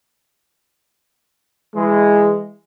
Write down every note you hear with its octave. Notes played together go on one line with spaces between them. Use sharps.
E3 G#3